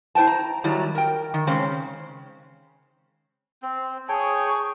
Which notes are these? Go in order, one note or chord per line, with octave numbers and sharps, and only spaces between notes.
E4 C5 G5 A5
A#5
D#3 F#3 G3 E4
A#4 G5
D#3
C#3 G#3 C4 C#4
C4 C5
G#4 C#5 G5 A5 C#6 D#6